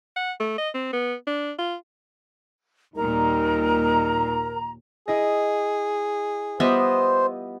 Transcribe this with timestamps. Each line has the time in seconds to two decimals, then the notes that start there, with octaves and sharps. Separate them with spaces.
0.16 F#5
0.40 A3
0.58 D#5
0.75 C4
0.93 B3
1.27 D4
1.59 F4
2.96 D#2 A#2 G3 D#4 A#4 A#5
5.08 E4 G#4 D#5
6.60 G3 B3 F4 G4 C5 D#5 E5